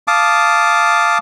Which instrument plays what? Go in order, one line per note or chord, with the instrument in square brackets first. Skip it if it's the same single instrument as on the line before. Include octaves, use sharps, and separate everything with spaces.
[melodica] F5 A5 D6 D#6